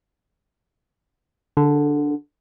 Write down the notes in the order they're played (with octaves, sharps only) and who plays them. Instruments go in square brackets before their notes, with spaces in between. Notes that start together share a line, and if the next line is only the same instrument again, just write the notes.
[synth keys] D3